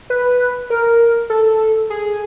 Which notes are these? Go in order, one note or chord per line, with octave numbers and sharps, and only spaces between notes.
B4
A#4
A4
G#4